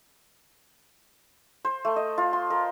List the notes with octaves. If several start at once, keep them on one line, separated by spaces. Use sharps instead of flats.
C5
A3
D#5
F4
C6
A#4